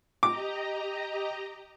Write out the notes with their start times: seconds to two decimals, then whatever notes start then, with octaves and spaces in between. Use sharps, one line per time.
0.23 G4 D#5 A#5 D6